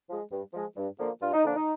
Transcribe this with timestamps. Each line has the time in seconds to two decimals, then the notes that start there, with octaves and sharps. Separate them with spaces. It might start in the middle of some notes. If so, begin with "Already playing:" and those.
0.08 F3 G#3
0.31 G2
0.53 F3 G#3
0.77 G2
0.99 D3 F3 A#3
1.21 G2 F4
1.33 D#4
1.44 D3 F3 A#3 D4
1.56 D#4